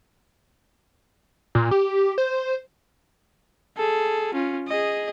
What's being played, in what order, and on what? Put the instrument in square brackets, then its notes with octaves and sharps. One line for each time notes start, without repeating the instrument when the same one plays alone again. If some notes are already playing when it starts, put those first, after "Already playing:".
[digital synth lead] A#2
G4
C5
[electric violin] G#4 A4
C#4 F4
G#4 D#5